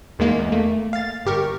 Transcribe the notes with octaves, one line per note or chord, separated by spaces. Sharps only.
E2 D#3 E3 G#3 A#3
E2
A3 A#3
F5 A6
G1 G4 A#4 C#6